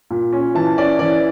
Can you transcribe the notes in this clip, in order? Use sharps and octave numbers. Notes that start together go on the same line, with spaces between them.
A#2
C#4
E3 A5
C#4 D5
E3 D5